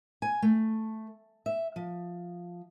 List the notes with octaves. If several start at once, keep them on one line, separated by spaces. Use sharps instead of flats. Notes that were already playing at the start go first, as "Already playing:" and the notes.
G#5
A3
E5
F3